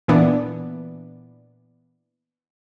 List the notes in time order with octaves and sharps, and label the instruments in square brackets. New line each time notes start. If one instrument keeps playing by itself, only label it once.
[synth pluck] A#2 E3 B3 D4